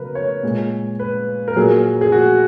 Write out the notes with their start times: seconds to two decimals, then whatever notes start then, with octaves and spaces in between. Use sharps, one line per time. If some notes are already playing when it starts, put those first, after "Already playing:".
Already playing: C#3 F#3 B3 A#4 B4
0.15 C#5
0.43 A#2 G#3
0.99 B4
1.48 A#4
1.56 A#2 F#3 G#4
2.01 G#4
2.12 F#4